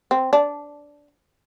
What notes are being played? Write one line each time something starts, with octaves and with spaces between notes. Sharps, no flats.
C4
D4